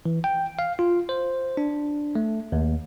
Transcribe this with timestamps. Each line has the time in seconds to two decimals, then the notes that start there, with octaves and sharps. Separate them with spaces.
0.05 E3
0.24 G5
0.59 F5
0.79 F4
1.09 C5
1.57 D4
2.15 A3
2.52 D#2